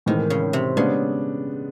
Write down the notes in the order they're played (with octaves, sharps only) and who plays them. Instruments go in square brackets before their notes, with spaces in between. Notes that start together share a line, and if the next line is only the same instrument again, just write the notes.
[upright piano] A2 E3 G#3 C4 [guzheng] D#3
[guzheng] C#3
C3
[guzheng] C#3 [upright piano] G#3 B3 D4